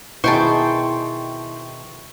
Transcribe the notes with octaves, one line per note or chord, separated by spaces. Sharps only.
B2 D#3 E4 G#4 C5 G5 A5 C#6